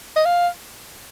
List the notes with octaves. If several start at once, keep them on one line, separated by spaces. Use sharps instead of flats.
D#5
F5